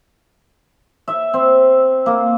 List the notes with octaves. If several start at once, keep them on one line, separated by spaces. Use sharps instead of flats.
E5
C4
A#3